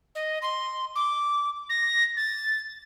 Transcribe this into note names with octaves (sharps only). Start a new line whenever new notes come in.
D#5
C6
D6
A#6
A6